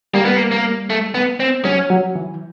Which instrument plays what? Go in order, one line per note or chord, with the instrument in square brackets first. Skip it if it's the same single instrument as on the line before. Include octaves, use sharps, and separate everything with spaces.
[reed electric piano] G3 [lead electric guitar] A#3
[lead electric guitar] B3
A#3
A#3
A3
B3
C4
[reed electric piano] F#3 [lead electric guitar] C#4
[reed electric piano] F#3
E3